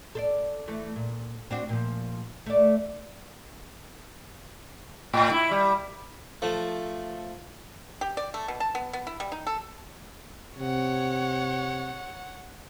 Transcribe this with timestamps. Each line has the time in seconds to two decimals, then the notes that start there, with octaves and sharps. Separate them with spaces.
0.15 A4 C5 D5
0.68 E3 A3
0.96 A#2
1.51 C4 D4 F#4
1.69 A#2 F3
2.46 A3 D5
5.13 A2
5.31 E4
5.51 G3
6.42 F3 A3
8.01 G4
8.17 D5
8.34 A3
8.48 B2
8.60 A5
8.75 B3
8.93 B3
9.07 E4
9.20 G3
9.32 D#4
9.47 A4
10.58 C3 C#5 F#5